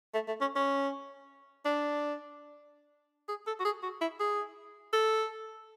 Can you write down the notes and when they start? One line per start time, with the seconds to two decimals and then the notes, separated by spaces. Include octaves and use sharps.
0.14 A3
0.28 A3
0.41 C#4
0.56 C#4
1.65 D4
3.29 G#4
3.47 A4
3.60 F#4
3.65 G#4
3.83 F#4
4.01 E4
4.20 G#4
4.93 A4